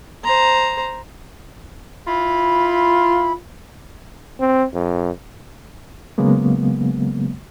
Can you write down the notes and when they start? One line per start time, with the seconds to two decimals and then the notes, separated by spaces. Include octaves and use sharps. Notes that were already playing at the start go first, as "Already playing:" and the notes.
0.24 C5 A#5
2.07 E4 F4 B5
4.40 C4
4.74 F2
6.18 C#3 F#3 G#3 A#3 B3